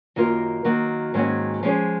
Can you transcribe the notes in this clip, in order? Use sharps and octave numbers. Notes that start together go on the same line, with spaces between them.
F#2 D#3 A#3 F4 A#4
D#3 F#3 A#3
G#2 D#3 F#3 A#3 C#4
F3 G#3 C#4 G#4 C#5